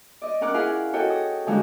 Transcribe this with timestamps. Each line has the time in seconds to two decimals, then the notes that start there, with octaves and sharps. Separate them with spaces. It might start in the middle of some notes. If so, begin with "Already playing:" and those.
0.22 D5 D#5
0.41 C#4 A#4 F#5 D6 F#6
0.54 C#4 E4 F4 G#4 F5 F#5
0.93 F#4 A4 C#5 D#5 G5
1.10 D#6
1.47 D3 F3 G#3 C#4 D#4 F#4